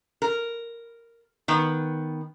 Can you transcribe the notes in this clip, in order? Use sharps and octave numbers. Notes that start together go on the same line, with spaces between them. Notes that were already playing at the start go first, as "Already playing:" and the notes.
A#4
D#3 B3